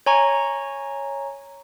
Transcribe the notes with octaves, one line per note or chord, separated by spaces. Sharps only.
C#5 G#5 A#5 C#6